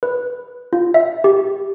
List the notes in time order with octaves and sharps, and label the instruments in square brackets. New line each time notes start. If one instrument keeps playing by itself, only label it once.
[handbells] B4
F4
E5
G4